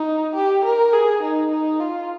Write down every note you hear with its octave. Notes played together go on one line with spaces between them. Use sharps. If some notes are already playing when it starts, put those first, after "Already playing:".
Already playing: D#4
G4
A#4
G#4
D#4
D#4
F4